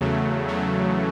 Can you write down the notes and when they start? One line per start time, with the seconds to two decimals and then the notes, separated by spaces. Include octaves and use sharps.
0.01 E2 C#3 F#3 A3
0.48 C#3 F#3 A3